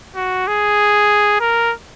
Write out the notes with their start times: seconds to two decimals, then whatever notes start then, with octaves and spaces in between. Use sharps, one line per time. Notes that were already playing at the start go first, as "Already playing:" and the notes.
0.16 F#4
0.47 G#4
1.41 A#4